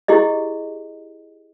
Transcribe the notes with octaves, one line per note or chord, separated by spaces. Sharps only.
E4 G4 G#4 D#5